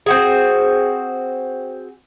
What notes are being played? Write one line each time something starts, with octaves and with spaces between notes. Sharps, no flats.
C4 F#4 G#4